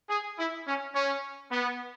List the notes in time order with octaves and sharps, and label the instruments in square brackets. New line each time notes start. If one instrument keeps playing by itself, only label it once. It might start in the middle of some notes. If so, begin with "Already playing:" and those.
[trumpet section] G#4
E4
C#4
C#4
B3